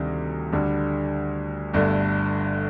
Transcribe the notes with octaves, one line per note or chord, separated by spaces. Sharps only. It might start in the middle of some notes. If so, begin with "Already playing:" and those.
Already playing: D2 C3 D#3 G3
D2 D3 G3
G1 G2 D3 A3